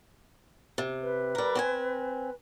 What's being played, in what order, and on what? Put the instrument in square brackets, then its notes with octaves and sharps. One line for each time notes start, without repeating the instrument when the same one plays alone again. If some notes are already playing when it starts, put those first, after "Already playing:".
[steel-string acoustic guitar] C3
[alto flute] B4
[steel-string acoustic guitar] G3 A#4
C4 D5 G#5